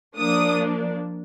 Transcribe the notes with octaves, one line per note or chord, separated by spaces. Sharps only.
F3 A#3 D4 D#6